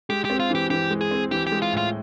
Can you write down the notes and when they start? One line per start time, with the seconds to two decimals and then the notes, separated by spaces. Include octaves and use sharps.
0.10 G#3 G4
0.25 C4 G4
0.40 F4
0.50 E3 G4
0.70 E3 G4
0.90 G#3
1.01 G#4
1.11 C4
1.31 E3 G4
1.47 G4
1.52 G#3
1.62 F4
1.72 A2 F4